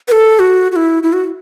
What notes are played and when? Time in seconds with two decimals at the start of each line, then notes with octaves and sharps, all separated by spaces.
0.08 B4
0.12 A4
0.39 F#4
0.72 F#4
0.76 E4
1.03 E4
1.13 F#4